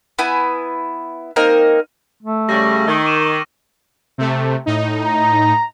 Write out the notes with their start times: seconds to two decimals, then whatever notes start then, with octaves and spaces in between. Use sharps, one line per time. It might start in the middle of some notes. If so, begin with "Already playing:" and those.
0.19 B3 E4 G#5
1.36 A#3 C4 D#4 A#4
2.23 A3
2.49 C#3 G3 C#6 A#6
2.87 D#3 E6
3.05 D6 D#7 E7
4.18 C3 A3
4.66 A2 D#4
5.03 A#5